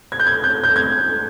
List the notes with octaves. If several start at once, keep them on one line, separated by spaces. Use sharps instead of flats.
G#6
G6
G#6
G6
G6
G#6